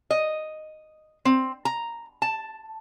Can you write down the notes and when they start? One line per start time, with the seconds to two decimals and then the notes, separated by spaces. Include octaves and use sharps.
0.11 D#5
1.25 C4
1.65 A#5
2.22 A5